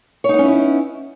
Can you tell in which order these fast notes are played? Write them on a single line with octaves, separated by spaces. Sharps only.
C#5 D#4 B3 C#4 E4